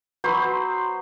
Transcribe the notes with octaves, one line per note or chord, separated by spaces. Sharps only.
F#3 B3 C5 B5